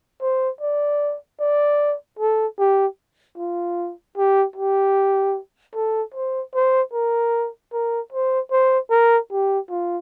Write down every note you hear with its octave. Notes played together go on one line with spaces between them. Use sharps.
C5
D5
D5
A4
G4
F4
G4
G4
A4
C5
C5
A#4
A#4
C5
C5
A#4
G4
F4